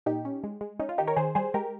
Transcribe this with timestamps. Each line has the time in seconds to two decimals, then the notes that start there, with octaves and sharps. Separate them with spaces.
0.06 A#2 D#4 G4
0.25 C#4
0.44 G#3
0.61 G#3
0.80 C#4 D#4
0.89 F4
0.98 D#3 D#4 G4
1.07 A#4 C#5
1.16 D#3 G#4 C5
1.35 G3 G#4 C5
1.54 G#3 G4 A#4